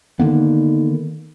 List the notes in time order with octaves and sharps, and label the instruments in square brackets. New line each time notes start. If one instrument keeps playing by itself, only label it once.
[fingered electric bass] D3 A#3 B3 [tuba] D#3